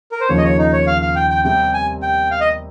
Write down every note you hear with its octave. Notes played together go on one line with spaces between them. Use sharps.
A#4
C5
D#2 C#3 F3 C#5
D#5
C#5
D#4
C#5
F5
F5
G5
G5
C3 G3 C4 G5
G#5
G5
F5
D#5